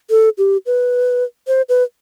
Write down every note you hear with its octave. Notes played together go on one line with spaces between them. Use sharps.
A4
G4
B4
C5
B4